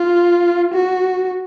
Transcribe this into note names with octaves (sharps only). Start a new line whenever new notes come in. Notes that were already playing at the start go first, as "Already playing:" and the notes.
Already playing: F4
F#4